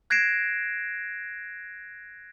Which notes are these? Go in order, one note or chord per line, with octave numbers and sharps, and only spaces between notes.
F#6 G#6 A#6 C7 D7 E7